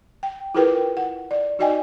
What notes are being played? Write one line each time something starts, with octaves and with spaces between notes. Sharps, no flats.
G5
E4 F4 G#4 A#4 B4 G5
F#5
D5
D#4 F#4 D5 D#5 G5 G#5